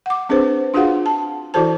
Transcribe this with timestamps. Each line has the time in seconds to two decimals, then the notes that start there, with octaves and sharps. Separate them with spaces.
0.06 F#5 D6
0.29 C4 D4 G#4 B4 C5
0.74 D4 F4 F#4 G#4 F5 F#5
1.06 A5
1.54 E3 E4 F#4 A4 C5 A5